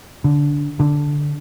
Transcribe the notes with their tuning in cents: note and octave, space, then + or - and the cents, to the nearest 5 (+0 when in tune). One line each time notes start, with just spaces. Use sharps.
D3 -15
D3 -5